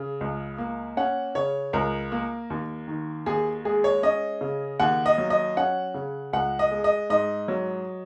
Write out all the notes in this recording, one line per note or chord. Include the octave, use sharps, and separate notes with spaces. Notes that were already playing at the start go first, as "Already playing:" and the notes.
Already playing: C#3
C#2
A#3
C#4 F#5
C#3 C#5
C#2 A#4
A#3
D#2
D#3
D#2 G#4
G#3 G#4
C#5
C#4 D#5
C#3
D#2 F#5
D#5
F#3
D#5
C#4 F#5
C#3
C#2 F#5
D#5
G#3
D#5
G#2 D#5
F#3